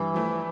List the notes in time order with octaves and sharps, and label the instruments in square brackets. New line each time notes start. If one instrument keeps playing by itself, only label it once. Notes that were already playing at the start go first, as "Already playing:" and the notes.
Already playing: [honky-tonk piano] G2 [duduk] E3
[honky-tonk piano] F3 A3 E4